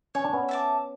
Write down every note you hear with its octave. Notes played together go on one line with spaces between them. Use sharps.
C#4 C#5
D4
B3 C#4
E5 A5 D6